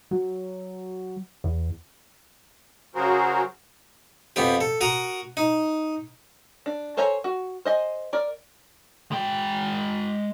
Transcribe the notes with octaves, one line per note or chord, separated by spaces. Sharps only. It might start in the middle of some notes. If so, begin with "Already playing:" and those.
F#3
E2
C#3 F#3 F#4 G#4 A#4 C5
F2 B3 G4
A4
F#4 A#4 A#5 D#6
D#4
D4
A4 C5 C#5 G#5 A#5
F#4
C5 D#5 G#5
A#4 D5
G#3 G5